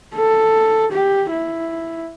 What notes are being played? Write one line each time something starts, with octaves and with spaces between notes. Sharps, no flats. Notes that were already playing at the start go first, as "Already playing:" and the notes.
A4
G4
E4